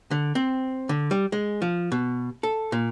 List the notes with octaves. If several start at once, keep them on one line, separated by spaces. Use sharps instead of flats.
D3
C4
D3
G3
G#3
F3
B2
A4
A#2